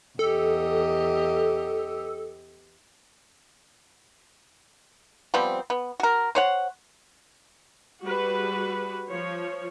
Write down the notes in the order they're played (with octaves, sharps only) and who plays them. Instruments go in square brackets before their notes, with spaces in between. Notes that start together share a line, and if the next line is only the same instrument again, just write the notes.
[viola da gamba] E2 G4 D#5 [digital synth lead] A4
[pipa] F3 G3 B3 C4
B3
F#4 A#4
C5 C#5 F#5
[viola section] G3 F#4 G#4 B4
F3 C#5